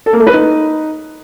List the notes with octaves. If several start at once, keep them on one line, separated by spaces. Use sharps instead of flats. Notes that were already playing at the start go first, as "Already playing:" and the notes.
A4
A#3
A3
B4
D#4